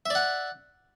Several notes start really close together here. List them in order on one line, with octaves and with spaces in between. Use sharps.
E5 D5 F#5